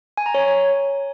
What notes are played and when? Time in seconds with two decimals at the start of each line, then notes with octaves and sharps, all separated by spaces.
0.17 G#5
0.26 A#5
0.35 C#5